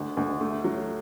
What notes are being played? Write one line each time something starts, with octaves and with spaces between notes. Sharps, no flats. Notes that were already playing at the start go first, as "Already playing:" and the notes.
Already playing: D2
D2
A3
F#3